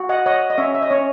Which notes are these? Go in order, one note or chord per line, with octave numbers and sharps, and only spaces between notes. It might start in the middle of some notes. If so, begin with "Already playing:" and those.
Already playing: F#4
D#5 F#5
C#5 D#5 F#5
D#5
C#4 C#5 E5
E5
D#5
C#4 C#5